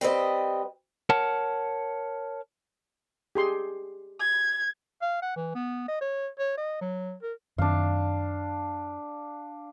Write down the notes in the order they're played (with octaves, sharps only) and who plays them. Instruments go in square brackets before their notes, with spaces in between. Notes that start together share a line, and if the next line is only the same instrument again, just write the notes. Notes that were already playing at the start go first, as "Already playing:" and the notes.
[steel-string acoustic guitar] G3 C4 B4 D#5
[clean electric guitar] A#4 C#5 F#5 A5
[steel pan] G4 G#4 C6
[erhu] G#6
[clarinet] F5
F#5
E3
B3
D#5
C#5
C#5
D#5
F#3
A#4
[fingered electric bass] F#2 D#3 C4 [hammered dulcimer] D4 F5